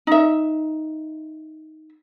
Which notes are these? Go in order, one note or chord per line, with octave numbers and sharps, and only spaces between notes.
D#4 E5